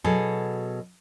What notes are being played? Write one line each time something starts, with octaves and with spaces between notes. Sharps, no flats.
B2 F#3 G#4 A4